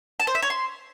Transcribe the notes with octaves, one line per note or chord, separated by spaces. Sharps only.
A5
C5
E5
C#5
C6